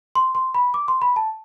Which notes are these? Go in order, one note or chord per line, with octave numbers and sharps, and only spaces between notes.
C6
C6
B5
D6
C6
B5
A5